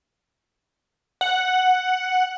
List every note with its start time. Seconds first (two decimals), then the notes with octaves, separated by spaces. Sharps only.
1.21 F#5